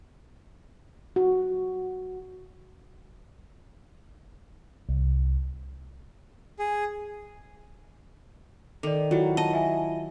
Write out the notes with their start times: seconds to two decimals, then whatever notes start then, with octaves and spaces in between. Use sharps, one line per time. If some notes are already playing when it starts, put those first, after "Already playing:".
1.16 F#4
4.89 C2
6.59 G#4
8.83 D#3 A4 D5
9.11 F#3 E4 F4
9.37 D#5 A5
9.54 E5 G#5